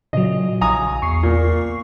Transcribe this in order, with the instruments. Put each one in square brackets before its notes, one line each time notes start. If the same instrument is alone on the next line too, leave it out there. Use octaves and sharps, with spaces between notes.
[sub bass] A#2 [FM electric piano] C#3 F#3 [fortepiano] D#5
[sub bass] A#1 [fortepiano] G#5 A#5 D#6
[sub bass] E2 [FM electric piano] C#6 C7
[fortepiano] A#2